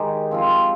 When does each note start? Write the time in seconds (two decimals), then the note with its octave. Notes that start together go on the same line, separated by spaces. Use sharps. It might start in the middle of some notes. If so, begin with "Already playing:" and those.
Already playing: D#3 G#3 D#4 G4
0.31 F3 C4 F4